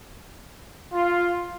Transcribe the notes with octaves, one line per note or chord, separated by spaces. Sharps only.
F4